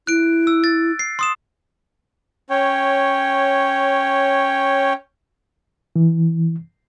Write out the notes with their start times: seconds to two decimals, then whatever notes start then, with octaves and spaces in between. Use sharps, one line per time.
0.07 E4 F#6 D7
0.47 E6
0.64 A6
0.99 C7
1.19 C6 D#6 E7
2.50 C#4 C#5 G5
5.96 E3